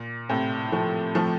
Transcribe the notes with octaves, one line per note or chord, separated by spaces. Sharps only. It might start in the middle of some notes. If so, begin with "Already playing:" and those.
Already playing: A#2
A2 C3
F3 A3
F3 A3